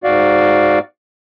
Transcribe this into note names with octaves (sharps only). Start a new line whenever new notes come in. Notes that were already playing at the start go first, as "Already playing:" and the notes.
G#2 F#4 D5 F5